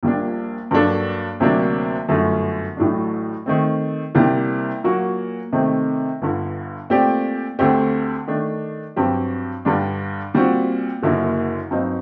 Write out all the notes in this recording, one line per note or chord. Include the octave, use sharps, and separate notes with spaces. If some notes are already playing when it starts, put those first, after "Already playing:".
A#1 A#2 G3 A#3 D4
G2 F#3 A#3 D4 A4
D2 C3 F#3 A#3 D4
G1 F#2 D3 F#3 A3
A1 A2 F#3 A3 D4
D#3 A3 C4
C2 C3 G3 A#3
A#2 F#3 A#3 F#4
C3 D#3 A3 C4
G1 G2 D3
A#2 A3 C4 G4 D5
D2 D3 A3 C4 G4
D#3 A3 D4
G2 F#3 C4 G4
G2 D3 G3 D4
A#2 G3 C4 F#4
F#1 F#2 D3 F#3 A#3
G2 F#3 C4 D#4